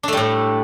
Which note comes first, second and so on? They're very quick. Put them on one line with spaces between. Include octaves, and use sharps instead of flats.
D4 A3 G3 A2